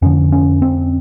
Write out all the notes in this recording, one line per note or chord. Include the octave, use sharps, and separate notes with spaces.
F2 D3 C#4
C#4
C4